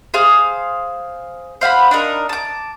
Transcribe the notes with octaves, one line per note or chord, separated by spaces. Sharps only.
G#4 C5 F5 F6
C5 F5 F#5 B5
D4 D#4 A#4
A5 D6